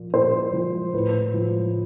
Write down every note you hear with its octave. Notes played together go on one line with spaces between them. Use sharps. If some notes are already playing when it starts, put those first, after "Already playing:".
Already playing: A#2 F3
A#2 C5
F3
A2 B4
F3